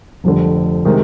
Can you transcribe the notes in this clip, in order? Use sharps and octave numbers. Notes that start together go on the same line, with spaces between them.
F1 F2 D3
C3 D#3 G#3